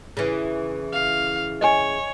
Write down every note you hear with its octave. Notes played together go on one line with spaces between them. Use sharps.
C#3 E3
F5
C#5 D#5 G#5